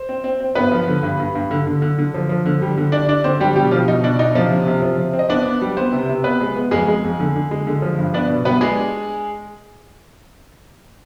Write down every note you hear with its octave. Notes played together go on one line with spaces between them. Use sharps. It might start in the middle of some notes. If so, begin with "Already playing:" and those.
Already playing: C5
C4
C4
C4
G2 B3 B4
F3
D3
G2
G2
G2
D3
D3
D3
D3
F3
F3
D3
G3
D3
D4 D5
D4 D5
D3 C4 C5
G3 D4 G4
B2 G3 G4
B2 F3 F4
B2 D#4
B2 D4
D4 D#4
C3 F3 F4
C3
C3
F3
C3
C4
D#5
B3 D4 D5
B3
G3
B3 C4 C5
C3
C3
B3 B4
G#3
B3
F2 G#3 G#4
G#3
F2
D3
D3
G#3
D3
F3
G2
B3 D4 D5
B2
G3 B3 B4
G#3 D4 G#4